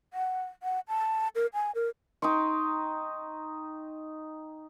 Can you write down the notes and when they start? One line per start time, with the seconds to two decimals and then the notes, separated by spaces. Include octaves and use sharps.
0.14 F#5
0.63 F#5
0.88 A5
1.35 A#4
1.54 G#5
1.75 A#4
2.22 D#4 G5 C6 C#6